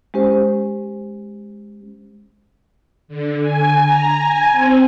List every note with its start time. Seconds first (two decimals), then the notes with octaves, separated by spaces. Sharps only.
0.14 G#3 C#4 G4 C5
3.08 D3
3.41 G#5
3.81 A#5
4.15 G#5
4.52 C4